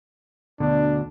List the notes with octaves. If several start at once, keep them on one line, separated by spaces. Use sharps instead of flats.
D2 B2 D3 D4